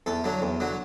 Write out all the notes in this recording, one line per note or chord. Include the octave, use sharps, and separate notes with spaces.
E2 A4
D3 F#3
E2
D3 F#3